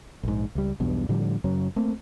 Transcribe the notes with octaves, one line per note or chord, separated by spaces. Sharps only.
A#1 G#2
C#2 G3
B1 E2 G2 B2
A2 D3 F3 G3
F#2 C#3 F#3 C#4
A3 A#3 C4